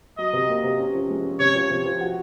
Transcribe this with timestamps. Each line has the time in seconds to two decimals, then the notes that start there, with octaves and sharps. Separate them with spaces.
0.18 F#3 D#5
0.33 C3
0.49 A#3
0.64 C3
0.80 C#4
0.94 F3
1.10 G#3
1.25 C#4
1.40 C3 C#5
1.55 F3
1.71 C3
1.85 F3
2.01 F#4